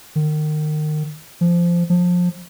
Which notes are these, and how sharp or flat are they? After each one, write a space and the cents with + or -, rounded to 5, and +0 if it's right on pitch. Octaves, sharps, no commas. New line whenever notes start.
D#3 -30
F3 -15
F3 +25